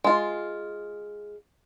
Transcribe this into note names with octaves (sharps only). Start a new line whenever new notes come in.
G#3 F4